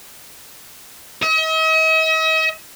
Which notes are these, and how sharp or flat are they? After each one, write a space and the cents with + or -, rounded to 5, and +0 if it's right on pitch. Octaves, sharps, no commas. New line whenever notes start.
D#5 +45